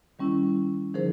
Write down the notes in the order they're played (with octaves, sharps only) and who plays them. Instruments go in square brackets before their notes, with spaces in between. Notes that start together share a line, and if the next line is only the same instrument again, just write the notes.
[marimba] D#3 G3 C#4 E4
D3 F3 D#4 G#4 A#4 C5